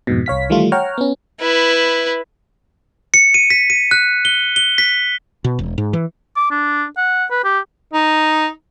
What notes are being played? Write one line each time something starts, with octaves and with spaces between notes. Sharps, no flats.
F2 G#2 B2
C2 C#5 F5 B6
D#3 E3 G3 A3 F4
C#5 F#5 G5 A#5 F6
B3 C#4
E4 B4
C#7
D#7
B6
D#7
F#6
G7
G7
B6
B2
E1
G#2
E3
D6
D4
F#5
B4
G4
D#4